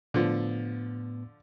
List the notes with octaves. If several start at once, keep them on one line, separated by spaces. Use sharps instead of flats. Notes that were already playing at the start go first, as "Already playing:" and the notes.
A2 D3 F3 B3